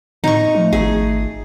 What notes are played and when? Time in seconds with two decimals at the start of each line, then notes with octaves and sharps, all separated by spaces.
0.24 A2 D#4 C#6
0.55 F3 A3
0.73 G#1 G#4